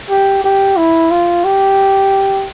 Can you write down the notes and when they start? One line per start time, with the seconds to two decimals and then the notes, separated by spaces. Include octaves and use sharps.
0.09 G4
0.44 G4
0.77 E4
1.11 F4
1.45 G4